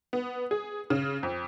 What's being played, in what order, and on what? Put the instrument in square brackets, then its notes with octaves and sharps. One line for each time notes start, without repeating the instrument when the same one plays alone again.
[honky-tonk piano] B3
G#4
C#3
F2